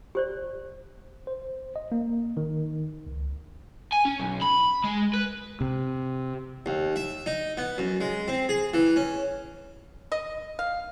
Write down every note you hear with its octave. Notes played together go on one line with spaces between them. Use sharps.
G4 C5 D5
C5
D#5
A#3
D#3
C#2
G#5
C#4
B1
B5
G#3
B4
C3
D#2
E5
D#4
B3
F#2
G#3
C4
G#4
E3
C#4
D#5
F5